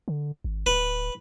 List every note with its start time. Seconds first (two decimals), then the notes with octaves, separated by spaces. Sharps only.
0.08 D3
0.44 G#1
0.66 D1 B4